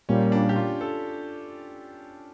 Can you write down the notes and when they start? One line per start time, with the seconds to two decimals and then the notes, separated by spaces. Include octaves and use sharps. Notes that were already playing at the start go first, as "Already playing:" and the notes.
0.09 A#2 G3 A#3 C#4
0.32 D4
0.49 G4
0.56 F4
0.81 A4